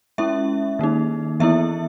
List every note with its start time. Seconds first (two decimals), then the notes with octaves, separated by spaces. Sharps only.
0.18 G#3 C#4 E4 E5
0.79 D#3 A#3 D#4
1.40 E3 B3 E4 E5